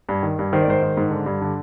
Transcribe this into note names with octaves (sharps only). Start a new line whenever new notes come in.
G2
D#3
G2
D#3 C5
D5
G#2 C5
D#3
G#2
D3
G2
D3